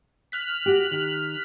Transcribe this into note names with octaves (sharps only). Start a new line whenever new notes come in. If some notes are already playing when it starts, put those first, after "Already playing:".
F6 F#6 B6
F#4 G4
D#3